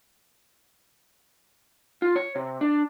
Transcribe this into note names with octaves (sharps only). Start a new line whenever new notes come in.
F4
C#5
C3
D4